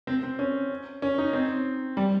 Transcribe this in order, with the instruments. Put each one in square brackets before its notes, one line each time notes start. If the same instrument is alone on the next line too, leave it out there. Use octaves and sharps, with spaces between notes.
[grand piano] C4
C4
C#4
C#4
D#4
C4
G3